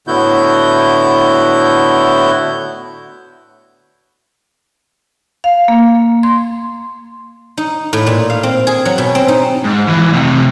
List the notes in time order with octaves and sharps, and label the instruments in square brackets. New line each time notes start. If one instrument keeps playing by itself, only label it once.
[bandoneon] A2 D3 B3 E4 F#4 G6
[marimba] F5
A#3
C6
[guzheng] D#4
A2
A#2
F5
C4
G#4
F#3
B2
C4
D#4
[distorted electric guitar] G#2
E3 F3
C3 A3